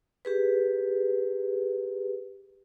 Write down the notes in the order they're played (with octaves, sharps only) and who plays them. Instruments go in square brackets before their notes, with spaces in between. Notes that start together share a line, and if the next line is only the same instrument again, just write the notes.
[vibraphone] G4 G#4 B4